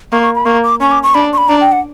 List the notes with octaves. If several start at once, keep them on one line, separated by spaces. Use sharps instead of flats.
A#3 C#6
C#6
B5
A#3 C#6
D6
C#4 C#6
D6
C#6
D4 B5
C#6
B5
D4 A#5
G5
F#5